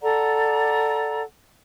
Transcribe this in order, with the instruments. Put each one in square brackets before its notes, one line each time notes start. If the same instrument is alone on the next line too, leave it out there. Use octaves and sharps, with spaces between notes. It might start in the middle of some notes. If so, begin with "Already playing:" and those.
[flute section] A4 D5 F#5 A#5